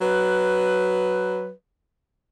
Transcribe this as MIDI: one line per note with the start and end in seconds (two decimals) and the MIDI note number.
0.01 1.49 54
0.01 1.49 71